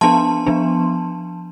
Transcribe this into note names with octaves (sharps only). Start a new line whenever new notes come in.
F3 B3 D4 A5 C6
F3 B3 D4